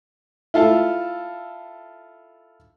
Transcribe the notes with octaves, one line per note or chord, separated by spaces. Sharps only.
E4 F4 A4 F5